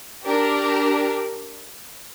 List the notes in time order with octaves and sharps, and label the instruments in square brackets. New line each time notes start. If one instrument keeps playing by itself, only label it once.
[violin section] D4 G4 A#4